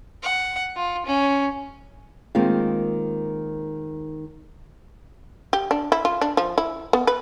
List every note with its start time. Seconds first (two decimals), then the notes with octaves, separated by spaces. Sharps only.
0.23 F#5
0.76 F4
1.06 C#4
2.35 D#3 G#3 A#3 C4 F4
5.53 G4
5.71 D4
5.92 E4
6.05 F4
6.21 D4
6.37 F3
6.58 E4
6.93 B3
7.07 B4